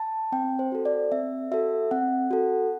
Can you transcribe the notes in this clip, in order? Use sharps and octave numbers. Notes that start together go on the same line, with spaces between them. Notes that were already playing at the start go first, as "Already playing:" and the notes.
Already playing: A5
C4 G5
C5
F#4 A4
D5
C4 E5
F#4 A4 E5
C4 F#5
F#4 A4